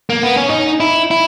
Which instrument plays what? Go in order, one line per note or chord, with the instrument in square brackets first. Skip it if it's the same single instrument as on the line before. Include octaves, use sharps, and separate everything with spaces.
[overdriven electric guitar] A#3
B3
C#4
D#4
E4
E4